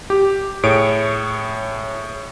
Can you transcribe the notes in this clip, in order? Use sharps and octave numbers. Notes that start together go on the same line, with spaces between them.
G4
A2 G#4 C#5 D7